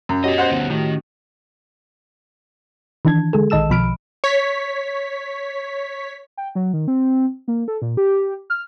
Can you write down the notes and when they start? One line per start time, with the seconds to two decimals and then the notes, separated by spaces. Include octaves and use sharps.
0.09 F#2
0.24 B3 C#4 F#4 G4 D#5
0.38 C5 F#5
0.51 D2 B3
0.70 A2 D#3
3.05 D#3 E3 D4 A5 G#6
3.33 D3 G#3 G#4 A4
3.50 A#1 D#3 D#5 A5 E6 E7
3.70 B1 B2 F3 B5 F6 D7
4.24 C#5 B6
6.37 G5
6.55 F#3
6.73 D#3
6.88 C4
7.48 A#3
7.68 A4
7.82 A#2
7.97 G4
8.50 F6